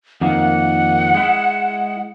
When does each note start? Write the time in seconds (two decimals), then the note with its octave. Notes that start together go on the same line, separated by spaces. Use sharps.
0.21 F2 D#3 A#3 F#5
1.14 G#3 E4